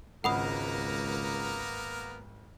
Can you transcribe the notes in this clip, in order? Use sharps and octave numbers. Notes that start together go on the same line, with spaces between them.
G#1 C#2 A#3 B3 A#4 F#5 B5 D#6